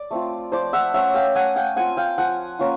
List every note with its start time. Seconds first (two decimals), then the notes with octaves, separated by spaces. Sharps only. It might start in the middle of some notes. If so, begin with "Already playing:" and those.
Already playing: D5
0.11 A3 C4 F4
0.52 F3 C5 D5
0.73 E5 F#5
0.94 A3 C#4 E5 F#5
1.15 F5 G5
1.35 A3 F#5 G#5
1.56 F5 G5
1.76 C4 F4 F#5 G#5
1.97 F5 G5
2.18 F3 F#5 G#5
2.59 A#3 C#4 F4